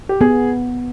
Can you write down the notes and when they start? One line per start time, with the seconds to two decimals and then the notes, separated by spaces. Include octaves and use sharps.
0.09 G4
0.21 B3 G#4